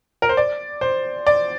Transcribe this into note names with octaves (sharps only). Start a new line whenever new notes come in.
A#4
C5
D5
C5
D5